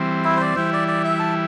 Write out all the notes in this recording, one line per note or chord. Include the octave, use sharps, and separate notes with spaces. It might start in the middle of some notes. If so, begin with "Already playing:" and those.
Already playing: E3 G3 C4
E4
C5
D5
E3 G3 E4 C5
D5
D5
E5
A5